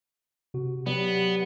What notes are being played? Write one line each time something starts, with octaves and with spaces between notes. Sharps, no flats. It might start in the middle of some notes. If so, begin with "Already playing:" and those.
C3 F#4
F#3 B3 G4 D5